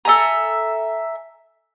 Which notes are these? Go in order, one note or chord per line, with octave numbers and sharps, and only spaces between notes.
A4 E5 G#5 A#5